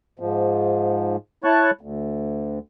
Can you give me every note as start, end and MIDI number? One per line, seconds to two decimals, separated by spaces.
0.19 1.16 44
0.19 1.16 53
1.44 1.71 64
1.44 1.71 73
1.44 1.71 81
1.44 1.71 85
1.44 1.71 90
1.81 2.59 38